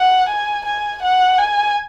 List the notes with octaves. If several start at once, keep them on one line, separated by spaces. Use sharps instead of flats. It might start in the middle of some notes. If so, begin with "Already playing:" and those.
Already playing: F#5
G#5
G#5
F#5
G#5